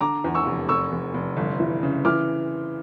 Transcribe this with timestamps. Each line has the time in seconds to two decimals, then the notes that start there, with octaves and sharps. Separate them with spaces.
0.01 D3 A#5 D6
0.24 E2
0.34 C#6 E6
0.47 F1
0.69 F1 C#6 E6
0.92 F1
1.14 F1
1.37 G1
1.60 E3
1.83 C#3
2.05 E3 D6 F6